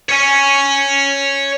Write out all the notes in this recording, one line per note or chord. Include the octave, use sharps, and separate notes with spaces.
C#5 G#5